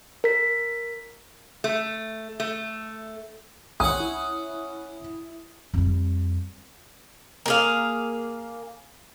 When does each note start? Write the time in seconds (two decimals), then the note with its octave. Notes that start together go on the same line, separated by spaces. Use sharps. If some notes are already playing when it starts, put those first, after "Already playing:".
0.24 A#4 B6
1.64 A3
2.40 A3
3.80 C2 C#4 F#5 D#6
4.00 E4
5.74 F2 G3
7.46 A#3 G#4 F5